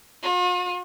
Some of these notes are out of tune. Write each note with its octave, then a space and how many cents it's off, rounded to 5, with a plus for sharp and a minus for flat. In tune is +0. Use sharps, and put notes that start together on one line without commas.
F4 +45